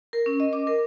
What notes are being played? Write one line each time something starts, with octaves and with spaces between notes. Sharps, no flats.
A#4
C#4
D#5
D6
A#4